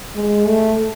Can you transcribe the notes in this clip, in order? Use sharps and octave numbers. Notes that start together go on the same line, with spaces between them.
G#3
A3